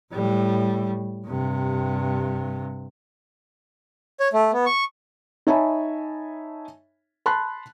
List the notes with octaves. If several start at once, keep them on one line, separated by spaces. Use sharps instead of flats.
A2 G3
G2 C3
C#5
A3
B3
C#6
D#4 C#5 E5 G#5 A5 B5
A5 B5 C6 F#6